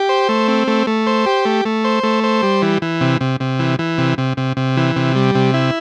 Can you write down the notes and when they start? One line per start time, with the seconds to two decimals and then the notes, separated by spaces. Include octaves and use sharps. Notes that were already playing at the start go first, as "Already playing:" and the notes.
Already playing: G4
0.09 C5
0.29 A3
0.48 C4
0.68 A3
0.87 A3
1.07 C5
1.26 G4
1.45 A3
1.65 A3
1.84 C5
2.03 A3
2.24 C5
2.43 G3
2.62 E3
2.82 E3
3.01 C3
3.21 C3
3.40 C3
3.59 E3
3.79 E3
3.98 C3
4.18 C3
4.37 C3
4.57 C3
4.77 E3
4.96 C3
5.15 G3
5.35 C3
5.54 E4